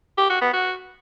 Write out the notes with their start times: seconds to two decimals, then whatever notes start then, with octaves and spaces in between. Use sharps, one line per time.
0.18 G4
0.29 F#4
0.41 B3
0.53 F#4